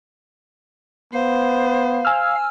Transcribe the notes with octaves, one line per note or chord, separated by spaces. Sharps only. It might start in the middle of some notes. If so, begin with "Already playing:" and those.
B3 C5 F5
G#5 E6 F6